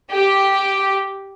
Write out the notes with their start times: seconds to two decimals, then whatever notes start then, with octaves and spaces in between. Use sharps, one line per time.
0.12 G4